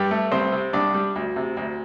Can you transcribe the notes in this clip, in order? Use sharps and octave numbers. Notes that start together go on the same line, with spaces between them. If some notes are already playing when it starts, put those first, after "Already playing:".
Already playing: G2 G3 G4
A3
C2 C4 C5
C3
C2 D4 D5
G3
D2
C3
D2